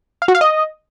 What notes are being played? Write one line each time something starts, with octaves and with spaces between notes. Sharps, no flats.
F5
F#4
F5
D#5